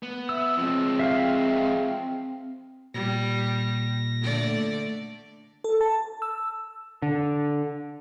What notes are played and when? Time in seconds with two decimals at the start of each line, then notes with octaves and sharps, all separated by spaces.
0.03 B3
0.29 E5 E6
0.57 F3 G#3 C4
0.99 E5 F5
2.94 A#2 G3 A#6
4.21 D3 A3 D5
5.64 A4
5.81 A5
6.22 E6
7.02 D3